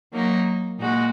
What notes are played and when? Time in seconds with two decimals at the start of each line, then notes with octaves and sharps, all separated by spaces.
0.12 F#3 A#3 D#4 A#4
0.78 A#2 G#3 D#4 F#4